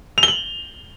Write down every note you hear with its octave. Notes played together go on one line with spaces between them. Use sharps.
F7
G7
F#7